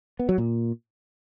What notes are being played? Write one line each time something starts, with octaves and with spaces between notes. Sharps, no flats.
B3
F#3
A#2